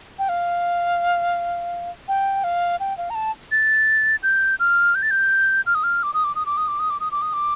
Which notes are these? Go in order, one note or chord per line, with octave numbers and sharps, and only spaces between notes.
G5
F5
G5
F5
G5
F5
A#5
A5
A6
G6
F6
G6
A6
G6
F6
D#6
F6
D6
D#6
D6
D#6
D6
D#6
D6
D#6
D6
D#6
D6
D#6
D6